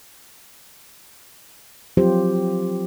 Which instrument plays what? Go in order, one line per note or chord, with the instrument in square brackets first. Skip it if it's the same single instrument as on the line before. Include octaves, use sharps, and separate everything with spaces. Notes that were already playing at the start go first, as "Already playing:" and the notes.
[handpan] F3 F#3 C4 F4 G4 C5